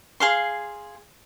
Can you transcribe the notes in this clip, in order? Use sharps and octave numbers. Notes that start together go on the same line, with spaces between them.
G#4 F5 C6